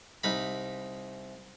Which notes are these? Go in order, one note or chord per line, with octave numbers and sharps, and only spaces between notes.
C2 D#4 B5